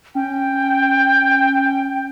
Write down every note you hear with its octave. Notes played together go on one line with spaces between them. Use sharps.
C#4 G5